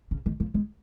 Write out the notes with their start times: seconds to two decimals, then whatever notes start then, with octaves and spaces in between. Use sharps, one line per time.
0.11 C#3
0.26 D#3
0.40 F3
0.54 G#3